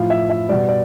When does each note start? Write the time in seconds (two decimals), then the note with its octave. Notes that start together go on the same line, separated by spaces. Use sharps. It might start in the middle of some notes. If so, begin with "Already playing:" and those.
Already playing: A2 F3 F5
0.10 E5
0.30 E5
0.49 B2 G3 D5
0.69 D5